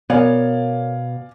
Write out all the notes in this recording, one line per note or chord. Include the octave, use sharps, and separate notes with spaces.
B2 B3 A#4 C#5 D5 F5 G#5